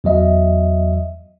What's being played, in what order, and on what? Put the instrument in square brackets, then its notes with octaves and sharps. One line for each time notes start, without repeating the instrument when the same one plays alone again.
[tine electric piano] E2 F#3 D#5 E5